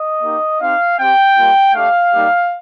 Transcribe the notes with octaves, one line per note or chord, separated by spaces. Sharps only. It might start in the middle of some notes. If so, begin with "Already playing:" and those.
Already playing: D#5
A#3 D#4 G4
C4 D#4 G4 F5
C4 G4 G5
G3 A#3 F4
A3 D4 G4 F5
G3 A#3 D#4 G4